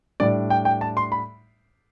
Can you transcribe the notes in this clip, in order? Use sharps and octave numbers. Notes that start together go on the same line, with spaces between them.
A2 G3 D4 D5
G5
G5
A5
C6
B5